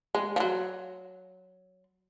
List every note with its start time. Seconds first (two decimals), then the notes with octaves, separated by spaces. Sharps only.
0.15 G#3
0.36 F3
0.40 F#3